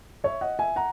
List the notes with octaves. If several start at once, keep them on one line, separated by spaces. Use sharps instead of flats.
C#5 E5
D#5 F#5
E5 G#5
F#5 A#5